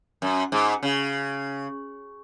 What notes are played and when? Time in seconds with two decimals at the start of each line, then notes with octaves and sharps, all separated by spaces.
0.22 F#2
0.52 G#2
0.83 C#3